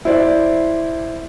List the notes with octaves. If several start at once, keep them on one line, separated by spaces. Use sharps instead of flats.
E4 C5 D5